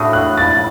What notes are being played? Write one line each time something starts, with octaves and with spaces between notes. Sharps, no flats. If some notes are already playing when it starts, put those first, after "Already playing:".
Already playing: A2 A3 D4 F#4 D#6
F#6
A6